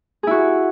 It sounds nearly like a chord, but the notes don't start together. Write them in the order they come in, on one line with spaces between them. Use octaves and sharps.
G#4 E4 F#4